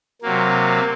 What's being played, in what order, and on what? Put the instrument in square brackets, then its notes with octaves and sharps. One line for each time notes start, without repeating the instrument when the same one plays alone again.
[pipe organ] C3 F#3 A#3